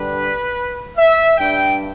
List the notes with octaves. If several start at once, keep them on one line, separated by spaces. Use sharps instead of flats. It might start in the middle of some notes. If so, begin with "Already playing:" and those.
Already playing: D3 G3 D4 B4
E5
G2 G3 D4 G5